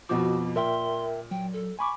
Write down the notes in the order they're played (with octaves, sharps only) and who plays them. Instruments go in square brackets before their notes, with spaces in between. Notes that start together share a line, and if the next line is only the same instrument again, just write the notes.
[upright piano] F2 B2 F3 [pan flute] F#4 [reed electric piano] D6
[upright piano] A#2 [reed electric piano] A#4 E5 G5 [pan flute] C6
[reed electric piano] F#3 [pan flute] G5
[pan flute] A4
[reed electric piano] G#5 B5 D6 [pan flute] C#6